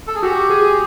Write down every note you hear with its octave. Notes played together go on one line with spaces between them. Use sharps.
A4
G#4
F#4 G4
G#4